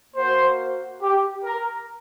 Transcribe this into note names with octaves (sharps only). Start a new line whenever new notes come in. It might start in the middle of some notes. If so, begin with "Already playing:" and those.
A#3 F#4 C5
G4
A#4